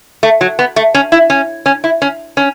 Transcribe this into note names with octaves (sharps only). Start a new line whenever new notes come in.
A3
F#3
B3
A3
C#4
E4
C#4
C#4
E4
C#4
C#4